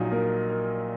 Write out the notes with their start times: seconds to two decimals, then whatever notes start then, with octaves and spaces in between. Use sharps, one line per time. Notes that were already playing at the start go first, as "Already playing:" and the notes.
Already playing: A#1 A#2 F#3 D#4 D#5
0.12 A#3 A#4
0.49 A#4